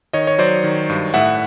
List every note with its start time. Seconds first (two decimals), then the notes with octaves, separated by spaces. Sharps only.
0.13 D#3 C#5 D#5
0.27 C#5
0.38 F#3 C5 D5
0.64 D#3
0.90 G2
1.14 A2 E5 F#5